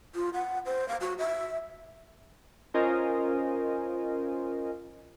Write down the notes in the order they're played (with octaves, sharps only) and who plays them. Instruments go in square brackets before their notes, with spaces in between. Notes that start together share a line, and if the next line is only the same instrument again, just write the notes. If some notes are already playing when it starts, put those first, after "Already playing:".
[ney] F4
F#5
C5
F5
F#4
E5
[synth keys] C#4 F4 A#4 C5 D#5 G#5